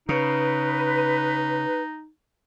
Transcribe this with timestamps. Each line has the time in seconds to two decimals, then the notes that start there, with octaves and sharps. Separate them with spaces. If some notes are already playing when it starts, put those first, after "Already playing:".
0.09 C#3 D#4 B4